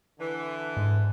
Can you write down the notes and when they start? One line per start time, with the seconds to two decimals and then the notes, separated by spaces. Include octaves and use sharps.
0.19 D3 E3
0.77 G#2